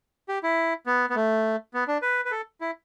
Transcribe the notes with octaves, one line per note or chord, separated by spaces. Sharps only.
G4
E4
B3
B3
A3
B3
D4
B4
B4
A4
E4